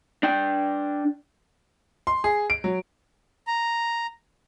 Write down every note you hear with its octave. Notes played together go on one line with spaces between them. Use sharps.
D4 G5
C6
G#4
D7
F#3
A#5